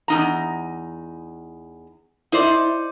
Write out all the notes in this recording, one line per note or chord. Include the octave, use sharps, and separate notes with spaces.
E2 D#4 A#5
D#4 E4 C5 D5